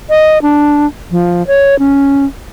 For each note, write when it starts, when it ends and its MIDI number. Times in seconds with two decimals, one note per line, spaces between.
0.10 0.41 75
0.42 0.86 62
1.11 1.46 53
1.47 1.78 73
1.79 2.26 61